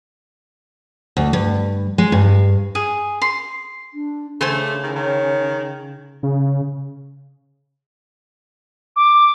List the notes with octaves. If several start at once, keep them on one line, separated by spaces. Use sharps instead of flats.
D2
G2
G#3
G2
G#4
C6
D4
G2 C#3 A3 D4 G4 C5 G#5 C6
D#3 E4
D#3 C#5
C#3
D6